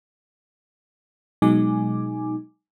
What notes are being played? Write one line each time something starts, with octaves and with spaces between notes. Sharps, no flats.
B2 F#3 G#3 D#4 G#5 D6